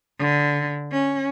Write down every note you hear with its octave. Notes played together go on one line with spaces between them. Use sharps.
D3
C#4